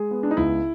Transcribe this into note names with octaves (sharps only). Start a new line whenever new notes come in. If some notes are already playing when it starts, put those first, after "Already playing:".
Already playing: G#3 G#4
B3
D4
D#4
C#2 E4